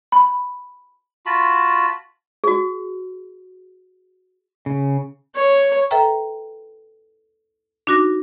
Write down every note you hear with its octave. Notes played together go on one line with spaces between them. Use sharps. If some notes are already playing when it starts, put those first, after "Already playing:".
B5
F4 F#4 A5 B5
F#4 G#4
C#3
C#5
A4 B4 E5 G5 A#5
D4 D#4 F#4 D6 A#6